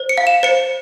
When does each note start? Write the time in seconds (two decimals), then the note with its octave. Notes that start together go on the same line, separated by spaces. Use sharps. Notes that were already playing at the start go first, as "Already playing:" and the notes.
Already playing: C5
0.09 C#7
0.18 F5
0.27 E7
0.43 C5 C#7